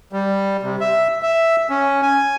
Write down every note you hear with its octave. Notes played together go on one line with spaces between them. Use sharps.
G3
C3
E5
E5
C#4
G#5